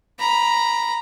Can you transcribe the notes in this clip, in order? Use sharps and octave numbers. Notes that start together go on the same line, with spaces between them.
A#5 B5